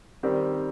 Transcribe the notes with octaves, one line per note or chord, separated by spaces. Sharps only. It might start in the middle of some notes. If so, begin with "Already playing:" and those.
D#3 G3 C4 G4